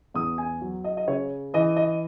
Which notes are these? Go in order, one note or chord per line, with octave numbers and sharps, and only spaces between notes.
E2 D#6
G#5
F#3
D#5
D#5
C#3 C#5
E3 D#5
D#5